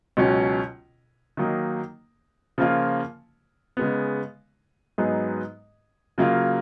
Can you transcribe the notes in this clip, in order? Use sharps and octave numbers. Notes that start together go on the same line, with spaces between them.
C#2 B2 F#3 C#4
D#3 F#3 A#3 D#4
C#3 F3 A#3 F4
C#3 G#3 B3
G#2 F#3 B3 D#4 G#4
C#3 F#3 A#3 F4